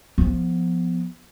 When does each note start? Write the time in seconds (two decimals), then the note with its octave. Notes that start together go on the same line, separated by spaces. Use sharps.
0.18 F3 B3